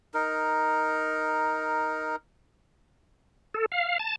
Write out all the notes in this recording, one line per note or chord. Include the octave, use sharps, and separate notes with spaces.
D#4 A#4
A4
F5
A5